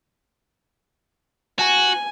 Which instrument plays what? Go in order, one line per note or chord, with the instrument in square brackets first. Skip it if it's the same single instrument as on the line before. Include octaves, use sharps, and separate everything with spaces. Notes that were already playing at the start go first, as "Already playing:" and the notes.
[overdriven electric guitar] F#4 [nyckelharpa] G#5